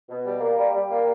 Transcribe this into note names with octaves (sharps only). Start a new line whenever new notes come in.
B2
G3
A#3
G3
G3
A#3